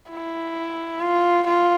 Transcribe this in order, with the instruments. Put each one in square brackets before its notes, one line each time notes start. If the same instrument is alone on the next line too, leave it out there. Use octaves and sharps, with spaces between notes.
[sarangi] E4
F4
F4